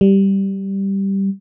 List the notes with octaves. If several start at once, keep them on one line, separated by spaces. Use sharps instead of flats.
G3